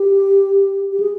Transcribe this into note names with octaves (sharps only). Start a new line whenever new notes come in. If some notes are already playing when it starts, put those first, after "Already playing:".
Already playing: G4
G4
G#4